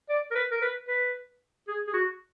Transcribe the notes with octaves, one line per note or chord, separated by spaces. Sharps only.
D5
A#4
B4
A#4
B4
B4
G#4
G#4
F#4